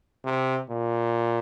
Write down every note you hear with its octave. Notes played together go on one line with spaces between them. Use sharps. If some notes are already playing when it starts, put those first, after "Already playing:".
C3
A#2